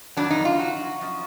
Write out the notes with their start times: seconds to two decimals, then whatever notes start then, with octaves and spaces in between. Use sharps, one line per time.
0.17 F2 D#3 F#3 D4
0.31 D#4
0.45 F4
0.59 F#4
1.01 F#2 F3